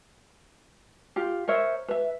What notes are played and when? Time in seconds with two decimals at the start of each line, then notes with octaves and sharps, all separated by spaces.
1.16 F4 G4
1.48 A#4 C5 C#5 E5
1.88 B4 E5